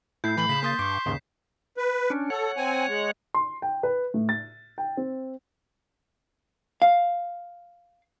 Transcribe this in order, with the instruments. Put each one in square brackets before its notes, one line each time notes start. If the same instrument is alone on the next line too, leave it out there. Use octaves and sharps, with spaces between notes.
[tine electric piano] A2 A3 [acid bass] E4 [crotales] G6 C7
[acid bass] E3 [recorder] B5
[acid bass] C#3 [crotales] B6 E7
[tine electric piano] A#3 D#6 A6 [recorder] C6
[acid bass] G2 [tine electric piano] C#6 D6
[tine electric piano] D#2 C#3 [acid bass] G#2
[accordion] B4
[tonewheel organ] C#4 D4
[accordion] A4 [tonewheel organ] C#5 F#5
[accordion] C4 G#5
G#3
[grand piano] C6
G5
B4
A2
A6
G5
C4
[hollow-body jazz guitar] F5